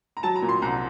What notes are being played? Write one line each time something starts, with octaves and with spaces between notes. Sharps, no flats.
A#5
F#3 A5
A#5
A#2
C6
C2 A#5